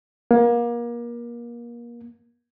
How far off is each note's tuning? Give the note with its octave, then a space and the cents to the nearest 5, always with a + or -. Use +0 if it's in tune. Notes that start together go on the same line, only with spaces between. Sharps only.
A#3 +30